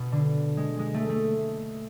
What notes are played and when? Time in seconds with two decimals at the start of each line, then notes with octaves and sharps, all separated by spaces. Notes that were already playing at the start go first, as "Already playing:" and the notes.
Already playing: B2
0.12 D3
0.57 G#3
0.79 G#3
0.94 A3
1.09 A3